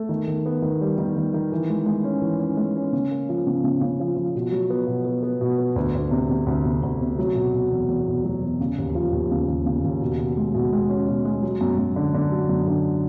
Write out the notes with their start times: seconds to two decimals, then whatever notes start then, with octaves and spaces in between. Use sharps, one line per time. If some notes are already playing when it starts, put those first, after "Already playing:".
Already playing: A3
0.09 D#3
0.28 D#3
0.46 B3
0.62 D#3
0.81 G3
0.98 D#3
1.16 D#3
1.34 D#3
1.52 E3
1.69 G#3
1.86 G#3
2.04 C#4
2.22 E3
2.40 C#4
2.57 G#3
2.76 C#4
2.92 C#3
3.11 A#3
3.29 F3
3.47 C#3
3.64 C#3
3.81 C#3
4.00 F3
4.16 F3
4.35 B2
4.52 F#3
4.70 B3
4.87 B2
5.05 B3
5.23 B3
5.41 B2
5.58 B3
5.76 D2
5.95 D2
6.11 C3
6.29 C3
6.47 D2
6.65 C3
6.83 D2
7.01 C3
7.19 F#3
7.35 B2
7.53 B2
7.71 E2
7.88 E2
8.07 B2
8.25 F#3
8.43 E2
8.60 C#3
8.78 D#2
8.95 F3
9.13 D#2
9.31 C#3
9.49 D#2
9.66 C#3
9.84 D#2
10.02 B2
10.19 B2
10.37 G#3
10.54 B2
10.73 G#3
10.89 C#4
11.08 B2
11.25 G#3
11.43 F#3
11.61 F#2
11.78 F#2
11.96 D3
12.14 D3
12.32 F#3
12.49 F#2
12.67 D3